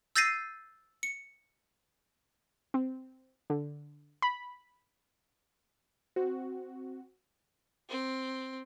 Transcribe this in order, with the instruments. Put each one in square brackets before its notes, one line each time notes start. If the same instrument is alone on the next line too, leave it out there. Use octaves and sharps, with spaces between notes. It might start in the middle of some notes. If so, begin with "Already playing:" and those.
[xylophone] E6 G6 A6 A#6 C7 D#7
C#7
[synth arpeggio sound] C4
D3
B5
[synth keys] C4 F#4
[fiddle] C4